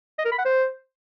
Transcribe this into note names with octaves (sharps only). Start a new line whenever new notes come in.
D#5
A#4
B5
F#5
C5